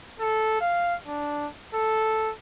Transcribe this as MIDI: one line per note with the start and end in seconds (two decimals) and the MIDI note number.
0.20 0.60 69
0.61 0.96 77
1.06 1.47 62
1.74 2.31 69